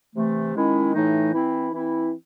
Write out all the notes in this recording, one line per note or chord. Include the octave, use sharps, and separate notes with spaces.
C3 E3 A3
D#3 G#3 C#4 E4
A2 E3 A3 D#4
E3 C4 E4
E3 C4 E4